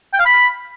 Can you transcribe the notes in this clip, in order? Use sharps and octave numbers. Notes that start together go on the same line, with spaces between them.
G5
F5
B5